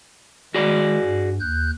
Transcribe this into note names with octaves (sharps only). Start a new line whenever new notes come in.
D#3 G#3 F#4 G#4 D5
G2
D#2 F#6 G6